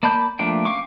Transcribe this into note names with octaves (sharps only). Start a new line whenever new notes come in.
A#3 D5 A5 B5 G6
F3 A3 A#3 D4 G5
C#4 F5 G5 C#6 D6